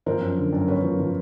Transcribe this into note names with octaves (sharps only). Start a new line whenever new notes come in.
F3 A#4 C5
F#2
D3
F#2
F#2 B4 C#5
F3
F3